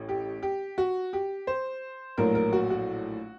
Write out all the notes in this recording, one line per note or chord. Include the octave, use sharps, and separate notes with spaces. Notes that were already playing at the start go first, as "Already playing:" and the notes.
Already playing: A1 A2
G4
G4
F#4
G4
C5
A#1 A2 F#3 A#4
A#4
F#4
F#4